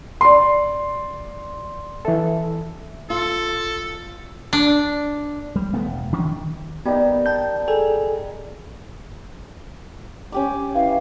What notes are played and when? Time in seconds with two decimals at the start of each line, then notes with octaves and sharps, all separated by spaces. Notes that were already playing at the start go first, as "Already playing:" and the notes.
0.21 D5 C6
2.05 E3 A4 E5
3.10 F4 A4
4.53 D4
5.56 G3
5.73 D1 D2 A3 B3
5.86 E1
6.12 D#3 F3 C#4 D4
6.25 D#3
6.86 G3 A#3 B3 D#4
7.26 G5 A5 G6
7.68 G#4 A4 G#5
10.32 C#4 G4 D6
10.75 E3 F5